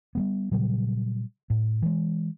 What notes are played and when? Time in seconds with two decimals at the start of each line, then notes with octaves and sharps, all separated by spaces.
0.15 G3 G#3 B3
0.51 A#2 C#3 F#3 G3
1.50 A2
1.82 E3 G#3